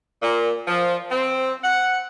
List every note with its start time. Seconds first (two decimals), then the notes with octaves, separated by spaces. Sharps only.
0.23 A#2
0.67 F3
1.11 C4
1.63 F#5